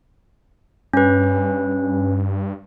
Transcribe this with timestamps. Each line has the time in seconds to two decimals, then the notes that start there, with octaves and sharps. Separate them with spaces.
0.93 G2 C#4 B4